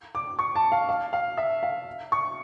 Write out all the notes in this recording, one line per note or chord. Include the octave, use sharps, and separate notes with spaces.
D6
C#6
A5
F5
F5
F5
E5
F5
C#6